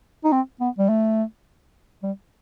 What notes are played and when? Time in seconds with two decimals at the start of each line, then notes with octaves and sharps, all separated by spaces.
0.24 D#4
0.32 C4
0.60 B3
0.78 G3
0.89 A3
2.03 G3